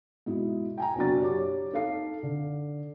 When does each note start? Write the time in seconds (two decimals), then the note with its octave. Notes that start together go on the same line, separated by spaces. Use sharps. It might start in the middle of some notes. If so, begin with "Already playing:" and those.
0.26 G#2 B2 E4
0.78 G5 G#5 A#5
0.96 F#1 B2 D4 F#4 D5 A6
1.21 G4 C#5 D6
1.73 D#4 A4 F5 C7
2.23 D3